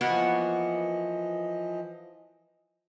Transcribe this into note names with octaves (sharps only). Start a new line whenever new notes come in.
E3 F3 A#3 B3 F#4 D#5